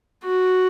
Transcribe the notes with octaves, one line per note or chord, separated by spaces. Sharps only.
F#4